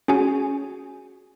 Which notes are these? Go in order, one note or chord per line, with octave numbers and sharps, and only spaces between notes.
C#4 F#4 G#4 G#5